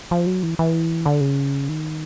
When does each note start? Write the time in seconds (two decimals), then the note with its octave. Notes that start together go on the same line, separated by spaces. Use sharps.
0.11 F3
0.27 F#3
0.43 E3
0.59 E3
1.06 D3
1.21 C#3
1.69 D#3